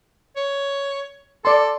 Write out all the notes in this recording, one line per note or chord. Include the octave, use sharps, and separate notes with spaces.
C#5
A4 D5 C6